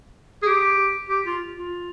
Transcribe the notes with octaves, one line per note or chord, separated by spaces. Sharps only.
G#4
G4
G4
F4
F4